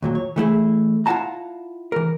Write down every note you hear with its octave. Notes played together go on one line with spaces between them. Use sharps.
D#2 A#2 F#3
C#5
E3 A3 E4 G#4
E4 F4 F5 F#5 A5 A#5
E3 A#4